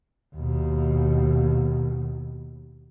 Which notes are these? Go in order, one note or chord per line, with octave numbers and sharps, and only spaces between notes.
D#2 B2